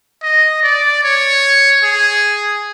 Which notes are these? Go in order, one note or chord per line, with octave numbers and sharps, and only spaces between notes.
D#5
D5
C#5
G#4